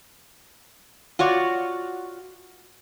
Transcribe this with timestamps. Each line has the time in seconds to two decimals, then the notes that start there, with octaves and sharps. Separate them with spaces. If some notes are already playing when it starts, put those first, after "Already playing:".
1.19 F4 F#4 C#5 D5